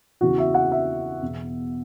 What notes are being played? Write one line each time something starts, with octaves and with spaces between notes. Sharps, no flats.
E2 C#3 E3 F#4
E5
F#5
E5
E2 B2